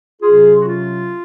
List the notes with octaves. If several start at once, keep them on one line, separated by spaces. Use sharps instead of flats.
C3 F#3 C#4 F4 G#4
F#4
F4